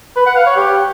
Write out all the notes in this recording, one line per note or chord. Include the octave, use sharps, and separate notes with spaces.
B4
F#5
F5
C#5
G4